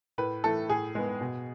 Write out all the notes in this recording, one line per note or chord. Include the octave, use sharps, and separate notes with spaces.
A2 B4
E3 A3 A4
A2 G#4
G#3 B3
B2